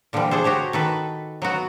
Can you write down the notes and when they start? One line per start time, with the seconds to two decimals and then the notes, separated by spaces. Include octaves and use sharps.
0.13 A#2 D3 E3 F3 G3
0.31 D4 G#4 A4 C5
0.44 F#4 G4 C5 C#5
0.73 D#3 A4 B4
1.42 F#3 B3 F#4